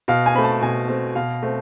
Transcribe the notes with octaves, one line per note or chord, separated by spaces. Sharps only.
B2 F5
G#5
A3 C4 B5
A5
B2 G#5
A3 C4
B2 F5
A3 C4